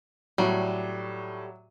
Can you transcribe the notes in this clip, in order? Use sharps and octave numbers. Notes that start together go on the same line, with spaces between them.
A2 F#3 G3